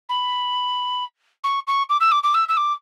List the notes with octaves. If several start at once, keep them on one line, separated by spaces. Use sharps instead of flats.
B5
C#6
C#6
D6
E6
D6
D6
E6
E6
D6